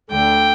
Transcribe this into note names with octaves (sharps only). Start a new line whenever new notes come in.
D2 D3 G5